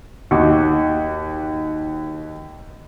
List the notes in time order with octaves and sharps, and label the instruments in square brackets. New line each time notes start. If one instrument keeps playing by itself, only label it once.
[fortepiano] D#2 F#4 D6